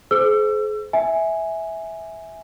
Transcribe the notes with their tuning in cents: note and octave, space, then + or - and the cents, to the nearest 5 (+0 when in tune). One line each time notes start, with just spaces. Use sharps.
G#4 +40 C5 -15 E6 +35
E5 -15 G#5 +0